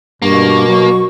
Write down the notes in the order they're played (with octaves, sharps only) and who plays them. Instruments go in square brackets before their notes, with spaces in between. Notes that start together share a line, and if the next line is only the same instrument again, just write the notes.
[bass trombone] G2 [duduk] B2 [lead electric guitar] A#3 [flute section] C#6
[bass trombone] F#3